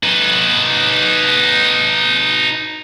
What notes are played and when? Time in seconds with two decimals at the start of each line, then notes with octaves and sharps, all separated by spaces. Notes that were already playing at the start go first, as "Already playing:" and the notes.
0.03 D#4 B4